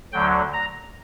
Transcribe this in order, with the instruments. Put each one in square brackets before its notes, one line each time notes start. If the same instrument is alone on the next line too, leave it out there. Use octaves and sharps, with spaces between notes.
[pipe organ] D2 D3 F#3 G5
A#5